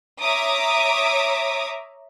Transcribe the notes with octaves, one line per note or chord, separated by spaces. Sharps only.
C#5 E5 A#5 D6 D#6